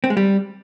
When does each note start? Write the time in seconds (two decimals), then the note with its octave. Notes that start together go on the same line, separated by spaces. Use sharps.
0.04 C4
0.10 G#3
0.17 G3